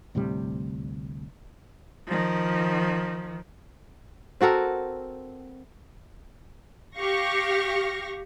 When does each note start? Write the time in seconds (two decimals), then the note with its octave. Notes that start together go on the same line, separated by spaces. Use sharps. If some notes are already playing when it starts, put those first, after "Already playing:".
0.15 D2 A2 C3 G3
2.07 D#3 F3
4.41 C4 F#4 A4 A#4
6.96 G4 F5 C#6 A#6